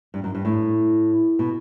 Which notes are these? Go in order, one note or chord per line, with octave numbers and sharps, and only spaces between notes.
G2
F#2
G2
A2
B2